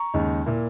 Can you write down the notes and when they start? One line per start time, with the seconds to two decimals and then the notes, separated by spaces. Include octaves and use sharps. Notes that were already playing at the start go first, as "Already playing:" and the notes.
Already playing: A#5 C#6
0.14 D#2 C#3 G#3 D#4
0.46 A#2 A#3 E4